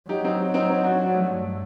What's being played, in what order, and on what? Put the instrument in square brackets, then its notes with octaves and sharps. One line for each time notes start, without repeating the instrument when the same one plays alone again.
[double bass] F#3 [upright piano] D#4 G4
[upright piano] C4 D#4
C4 D#4
C4 D#4
D4 F#4
D4 F#4
A3
[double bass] G2